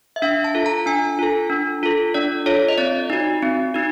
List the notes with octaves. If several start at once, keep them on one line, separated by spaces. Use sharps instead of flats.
E5
D4 F5
A5
F4 A4
A#5
D4 G#5
F4 A4
D4
F4 A4
D4 D5
F4 A4 C#5
D#5
C4 D5
D#4 F#4
C4
D#4 F#4